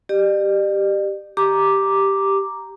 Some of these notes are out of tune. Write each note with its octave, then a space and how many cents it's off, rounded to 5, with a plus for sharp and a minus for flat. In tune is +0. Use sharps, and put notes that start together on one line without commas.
G4 +0 D5 +45
G4 +0 A#5 +0 D6 +0